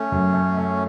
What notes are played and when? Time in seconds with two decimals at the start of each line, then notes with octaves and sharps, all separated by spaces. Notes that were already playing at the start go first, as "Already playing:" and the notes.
Already playing: A3 C#4
0.12 F#2
0.34 A3
0.57 A3